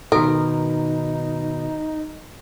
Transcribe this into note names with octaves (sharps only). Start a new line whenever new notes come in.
B2 D#3 D#4 F#4 A4 A#4